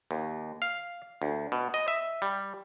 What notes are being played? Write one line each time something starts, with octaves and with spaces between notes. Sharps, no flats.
D#2
F5
D2
B2
D#5
E5
G3